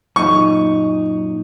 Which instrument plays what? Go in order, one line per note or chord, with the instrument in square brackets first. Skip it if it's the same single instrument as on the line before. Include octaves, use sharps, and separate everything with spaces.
[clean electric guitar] F#2 A#2 D#4 [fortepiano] C#6